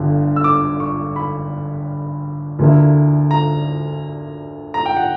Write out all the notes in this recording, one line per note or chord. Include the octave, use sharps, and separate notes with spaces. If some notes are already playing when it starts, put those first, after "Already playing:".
Already playing: G1 G2 D3
E6
D6
C#6
B5
D2 D3 A#3 E4
A#5
A#5
G5
F#5